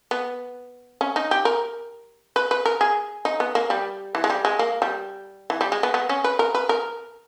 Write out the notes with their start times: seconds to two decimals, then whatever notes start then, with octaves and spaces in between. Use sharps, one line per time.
0.11 B3
1.01 C#4
1.16 D#4
1.31 G4
1.45 A#4
2.36 B4
2.51 B4
2.65 A#4
2.81 G#4
3.25 D#4
3.40 B3
3.55 A#3
3.70 G3
4.15 E3
4.24 G#3
4.30 G3
4.45 G#3
4.59 A#3
4.82 G3
5.50 E3
5.61 G3
5.72 G#3
5.83 B3
5.94 B3
6.09 C#4
6.24 B4
6.39 A#4
6.55 B4
6.69 A#4